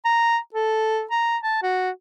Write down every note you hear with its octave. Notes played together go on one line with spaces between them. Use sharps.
A#5
A4
A#5
A5
F#4